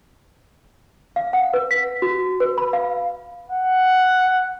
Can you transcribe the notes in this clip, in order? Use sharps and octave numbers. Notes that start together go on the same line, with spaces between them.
F5
F#5
B4
B6
F#4
B4
B5
F5
F#5